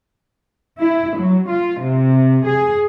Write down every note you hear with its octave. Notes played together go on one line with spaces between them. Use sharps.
E4
F#3
F4
C3
G#4